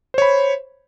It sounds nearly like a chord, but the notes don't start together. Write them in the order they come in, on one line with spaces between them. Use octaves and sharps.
C5 C#5 B5